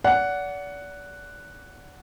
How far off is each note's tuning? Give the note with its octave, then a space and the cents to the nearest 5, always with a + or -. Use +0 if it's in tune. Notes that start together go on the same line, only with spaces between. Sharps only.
D5 -35 F#5 +0